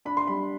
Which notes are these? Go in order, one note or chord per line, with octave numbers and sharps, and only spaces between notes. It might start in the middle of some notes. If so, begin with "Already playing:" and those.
D4 B5
C6
G3 B5